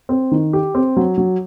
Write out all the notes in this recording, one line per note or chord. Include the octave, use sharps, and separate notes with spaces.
C4
D#3
G4
C4
F#3
F#3